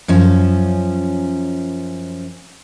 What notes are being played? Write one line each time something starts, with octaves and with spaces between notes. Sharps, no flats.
F#2 F3 C#4